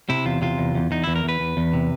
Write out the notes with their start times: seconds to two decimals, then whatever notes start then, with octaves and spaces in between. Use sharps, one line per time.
0.09 C3 E4
0.25 E2 F4
0.42 C3 F4
0.58 E2
0.75 E2
0.91 E2 D#4
1.04 E2 E4
1.16 A#4
1.24 E2 B4
1.40 E2
1.57 E2
1.73 C3